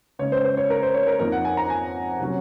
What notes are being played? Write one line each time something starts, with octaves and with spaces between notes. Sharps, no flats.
C#3 G#3 C#4 C#5
C5
C5
C#5
A#4
C5
C#5
A#4
F2 D#3 A#3 A#4
F#5
G#5
A#5
G#5
C3 F#3 C#4 F#5